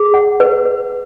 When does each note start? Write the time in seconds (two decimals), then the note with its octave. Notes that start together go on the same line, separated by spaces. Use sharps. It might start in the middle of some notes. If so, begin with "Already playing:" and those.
Already playing: G#4
0.14 F#5
0.40 B4
0.65 B4